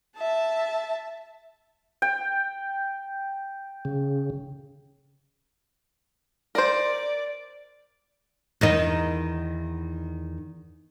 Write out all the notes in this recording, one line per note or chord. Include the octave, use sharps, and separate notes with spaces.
E5 A5
G5
C#3
A#4 C5 D5
E2 D#3 D#4